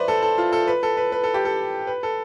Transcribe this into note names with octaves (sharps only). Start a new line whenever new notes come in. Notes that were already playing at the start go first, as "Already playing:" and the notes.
Already playing: B4 C5 D5 E5
A4
A4
F4
A4
B4
A4
B4
B4
A4
G4
A4
B4
A4